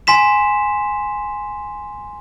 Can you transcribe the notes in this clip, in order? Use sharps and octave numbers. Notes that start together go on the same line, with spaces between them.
G#5 C6 B6 E7